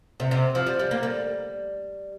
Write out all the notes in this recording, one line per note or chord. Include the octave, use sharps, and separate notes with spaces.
C3
C3
F3
G3
G3
A#3
G3